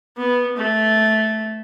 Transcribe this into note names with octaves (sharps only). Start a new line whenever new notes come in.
B3
A3